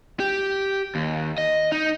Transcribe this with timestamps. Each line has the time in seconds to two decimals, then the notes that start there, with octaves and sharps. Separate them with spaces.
0.20 G4
0.95 D#2
1.38 D#5
1.72 D#4